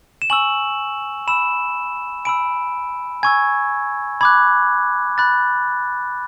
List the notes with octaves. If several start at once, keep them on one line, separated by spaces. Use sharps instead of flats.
E7
G#5 C#6 E6 F#7
B5 E6 E7
G#5 B5 E6 D7
G#5 C#6 E6 G#6
B5 D6 F#6 G#6
B5 F#6 A6